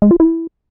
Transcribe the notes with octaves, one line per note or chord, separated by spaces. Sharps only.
G#3
F4
E4